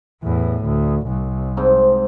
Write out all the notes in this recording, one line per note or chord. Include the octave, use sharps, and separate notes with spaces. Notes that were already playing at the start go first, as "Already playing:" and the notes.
E2 A2
D2
C2
G#2 C4